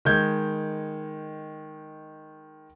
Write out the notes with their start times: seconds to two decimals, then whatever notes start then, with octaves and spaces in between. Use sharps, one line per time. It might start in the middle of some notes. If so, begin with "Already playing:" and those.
0.05 D#3 G#3 G6 G#6